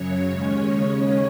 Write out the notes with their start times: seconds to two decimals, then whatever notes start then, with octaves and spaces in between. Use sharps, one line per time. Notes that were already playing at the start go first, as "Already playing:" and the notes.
Already playing: F#2 C#3 F#3 C#5
0.30 D#2 D#3 G#3 C#4
0.74 D#2 C#3 G#3 C#4